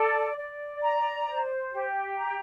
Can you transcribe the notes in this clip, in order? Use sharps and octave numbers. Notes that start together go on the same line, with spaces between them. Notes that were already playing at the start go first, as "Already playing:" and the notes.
Already playing: A4 D5
D5
A#5
C5
G4
A#5